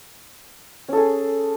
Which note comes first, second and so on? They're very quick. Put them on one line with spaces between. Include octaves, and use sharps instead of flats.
C#4 A4 G#4